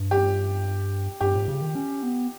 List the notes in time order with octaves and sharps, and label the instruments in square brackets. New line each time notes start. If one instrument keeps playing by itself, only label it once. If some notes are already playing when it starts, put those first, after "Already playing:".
Already playing: [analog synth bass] G2
[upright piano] G4
[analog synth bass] G2 [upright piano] G4
[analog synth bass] G#2
C#3
D#3
C#4
B3